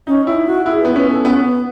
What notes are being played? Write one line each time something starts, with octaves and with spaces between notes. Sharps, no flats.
C#4 D#4
D#4 E4
F#4
E4 G#4
B3 B4
C#4 B4
A4
B3 C#4
B3